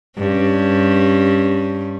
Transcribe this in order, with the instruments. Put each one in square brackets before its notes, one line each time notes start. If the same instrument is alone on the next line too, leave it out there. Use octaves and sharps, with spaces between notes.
[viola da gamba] G2 C#4